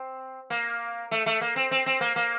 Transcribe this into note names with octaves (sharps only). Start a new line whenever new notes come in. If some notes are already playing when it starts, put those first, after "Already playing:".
Already playing: C4
A#3
A3
A3
A#3
C4
C4
C4
A#3
A#3